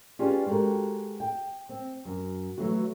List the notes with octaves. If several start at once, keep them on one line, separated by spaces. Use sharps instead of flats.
C#4 F4 G4 G#4 B4 D5
G#3 F#4 G4 A4 A#4
G5
C4
F#2
E3 F#3 A3 B3 F#4